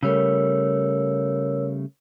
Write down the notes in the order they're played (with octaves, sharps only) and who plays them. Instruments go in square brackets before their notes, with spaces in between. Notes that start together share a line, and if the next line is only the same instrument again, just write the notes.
[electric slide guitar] C#3 G3 A3 [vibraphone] A#4 C#5 E6